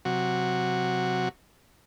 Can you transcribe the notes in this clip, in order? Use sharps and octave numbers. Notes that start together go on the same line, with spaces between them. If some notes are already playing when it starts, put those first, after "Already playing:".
C3 F#3 F#4